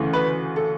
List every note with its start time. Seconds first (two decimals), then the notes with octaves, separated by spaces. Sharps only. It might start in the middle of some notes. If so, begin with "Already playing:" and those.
Already playing: D2 C#3 E3 A3
0.13 B4
0.56 A4